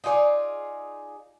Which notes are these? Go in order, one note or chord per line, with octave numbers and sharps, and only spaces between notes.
D#4 F4 G#4 D5